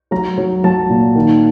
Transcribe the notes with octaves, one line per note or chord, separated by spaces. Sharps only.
F#3 A#5
F#3
F#3 A5
A#2
D#3